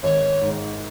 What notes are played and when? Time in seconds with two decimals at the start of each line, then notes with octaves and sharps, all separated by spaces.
0.03 G#1 C#5
0.41 G#2 D#3